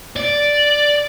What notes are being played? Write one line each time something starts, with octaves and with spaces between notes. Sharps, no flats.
D5